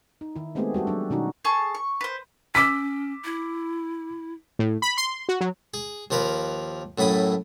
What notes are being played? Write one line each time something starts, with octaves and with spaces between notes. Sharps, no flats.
D#4
D#3 E4
G#3 A3 B3 C4 G4 G#4
G3 F#4 G4 A4
F#3 G3 D4
B2 D#3 C#4 D#4 F#4
G#4 A4 A5 C#6
C#6
B4 C5
C#4 D6 E6 B6
E4
A2
B5
C6
F#4
F#3
G#4
D#2 F3 A#4 B4 F5
F#2 A2 A3 B5 D#6